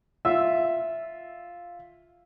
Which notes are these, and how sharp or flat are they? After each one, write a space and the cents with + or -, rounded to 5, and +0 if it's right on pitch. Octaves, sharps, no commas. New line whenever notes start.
F4 +0 E5 +0